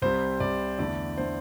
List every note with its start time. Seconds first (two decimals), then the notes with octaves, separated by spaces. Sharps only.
0.02 C2 C3 G3 C5
0.40 C2 C3 G3 D5
0.79 E2 D3 A3 D5
1.17 D3 A3 C5